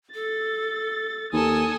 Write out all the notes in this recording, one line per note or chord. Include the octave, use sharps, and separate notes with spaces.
A4 A6
D#2 A4 G#5 D#6